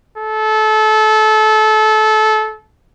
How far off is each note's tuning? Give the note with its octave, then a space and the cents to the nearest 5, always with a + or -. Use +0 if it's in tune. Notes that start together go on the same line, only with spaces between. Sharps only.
A4 -25